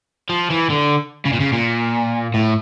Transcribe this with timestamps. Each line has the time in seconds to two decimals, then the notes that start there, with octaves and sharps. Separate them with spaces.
0.29 F3
0.50 E3
0.70 D3
1.25 C#3
1.33 A#2
1.40 C#3
1.53 A#2
2.34 A2